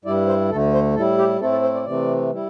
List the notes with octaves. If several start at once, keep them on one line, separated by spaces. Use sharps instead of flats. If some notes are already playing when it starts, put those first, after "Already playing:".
G2 G3 E4 D5
C5
D2 D3 A3 A4
C5
A2 G3 E4 A4
G4
A2 A3 C4 E4 A4
A4
C5
D5
C3 E3 A3 C4 D5
G3 E4